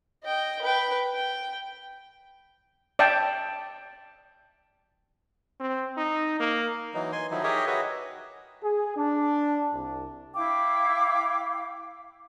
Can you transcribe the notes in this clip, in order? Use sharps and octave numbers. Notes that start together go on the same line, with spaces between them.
D#5 G5
B4 G5
G5
D5 E5 G5 A5
C4
D#4
A#3
E3 F#3 D#4
G#5 C6
D#3 F3 F#3 D#4 E4
G4 G#4 A#4 C#5 D#5 E5
F#4 G#4 B4 C#5 D#5 E5
G#4
D4
C2
E4 F5 G5 D6